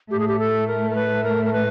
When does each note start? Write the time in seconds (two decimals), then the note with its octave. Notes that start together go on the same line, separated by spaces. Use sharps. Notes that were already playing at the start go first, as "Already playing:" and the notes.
0.10 A2 A3 G4
0.19 G#4
0.28 G4
0.39 A4
0.67 A#4
0.90 A#4
0.95 B4
1.24 A#4
1.45 A#4
1.53 B4